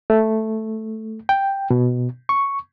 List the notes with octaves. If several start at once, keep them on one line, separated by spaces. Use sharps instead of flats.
A3
G5
B2
C#6